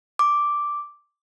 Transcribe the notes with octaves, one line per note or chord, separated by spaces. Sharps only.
D6